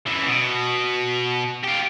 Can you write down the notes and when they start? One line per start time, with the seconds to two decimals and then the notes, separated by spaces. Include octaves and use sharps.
0.06 F#2 E3
0.27 B2
1.64 F4 G4